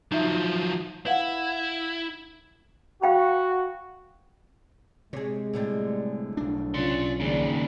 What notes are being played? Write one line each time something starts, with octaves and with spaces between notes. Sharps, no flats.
F3 F#3 D#4 E5
E4 B4 F5 F#5
F#4 F5 G5 B5
C3 G#3 G#4 C#5
A2 D3 G3
B1 D4
C#4 F4 D5 C6
D#2 A#2 C#3 G#4 D5